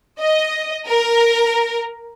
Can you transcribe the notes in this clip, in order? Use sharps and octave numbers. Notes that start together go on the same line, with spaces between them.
D#5
A#4